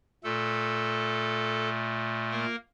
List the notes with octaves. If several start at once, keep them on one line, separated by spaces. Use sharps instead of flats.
A#2 A3 A4
A#3 A#4